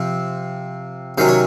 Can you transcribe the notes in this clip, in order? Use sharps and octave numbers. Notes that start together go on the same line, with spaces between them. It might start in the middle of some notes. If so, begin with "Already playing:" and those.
Already playing: C3 F3 C4
C3 D#3 F#3 C#4 C5
C#5